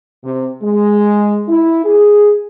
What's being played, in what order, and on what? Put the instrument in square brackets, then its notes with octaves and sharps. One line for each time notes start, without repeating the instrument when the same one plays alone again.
[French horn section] C3
G#3
E4
G#4